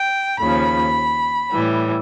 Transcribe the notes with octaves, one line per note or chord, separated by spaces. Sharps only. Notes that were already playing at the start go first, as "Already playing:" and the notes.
Already playing: G5
D#2 C#3 F3 B5
A2 E3 G3